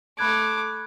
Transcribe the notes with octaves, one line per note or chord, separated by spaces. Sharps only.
A3 B5 D6 F#6 G#6